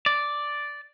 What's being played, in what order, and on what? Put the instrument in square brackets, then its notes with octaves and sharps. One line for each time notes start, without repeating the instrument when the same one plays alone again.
[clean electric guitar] D5